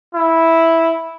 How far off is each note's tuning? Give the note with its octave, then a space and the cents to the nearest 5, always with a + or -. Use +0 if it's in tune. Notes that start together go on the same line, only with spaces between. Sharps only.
E4 -5